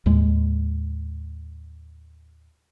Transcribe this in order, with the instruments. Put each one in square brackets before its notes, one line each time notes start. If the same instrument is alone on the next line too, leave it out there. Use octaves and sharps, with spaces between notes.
[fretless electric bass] D#2 A2 G#3